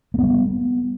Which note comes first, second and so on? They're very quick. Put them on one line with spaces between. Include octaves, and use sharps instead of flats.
A#3 B3 G3